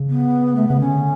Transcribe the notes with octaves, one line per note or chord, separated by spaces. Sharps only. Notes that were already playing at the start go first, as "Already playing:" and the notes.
Already playing: C#3
B3
A3
C#3 B3
D3 C#4